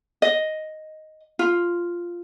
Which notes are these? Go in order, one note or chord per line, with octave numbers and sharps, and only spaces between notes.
D#5
F4